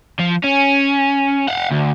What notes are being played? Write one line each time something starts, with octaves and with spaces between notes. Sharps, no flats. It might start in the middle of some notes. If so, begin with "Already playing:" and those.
F3
C#4
F5 F#5
D2